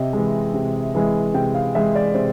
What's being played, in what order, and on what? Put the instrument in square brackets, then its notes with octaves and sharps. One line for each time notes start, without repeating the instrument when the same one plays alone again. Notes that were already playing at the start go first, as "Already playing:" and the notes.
Already playing: [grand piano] C3 D#5 E5
E3 G#3
C3
E3 G#3
C3 G5
F5
E3 G#3 E5
D5
C3 C5